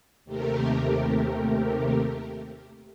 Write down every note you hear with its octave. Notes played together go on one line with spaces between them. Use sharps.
D#2 C3 A3 G4 A#4